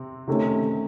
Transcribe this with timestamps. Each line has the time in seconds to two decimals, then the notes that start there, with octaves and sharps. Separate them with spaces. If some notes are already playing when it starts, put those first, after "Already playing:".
Already playing: C3 C4
0.27 C3 D#3 A3 C#4